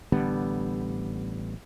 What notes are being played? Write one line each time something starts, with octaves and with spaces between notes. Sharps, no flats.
A1 D3 G3 B3